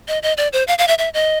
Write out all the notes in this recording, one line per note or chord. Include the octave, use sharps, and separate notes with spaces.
D#5
D#5
D5
C5
F5
F5
E5
E5
D#5